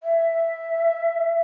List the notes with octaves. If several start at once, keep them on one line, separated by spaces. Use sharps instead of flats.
E5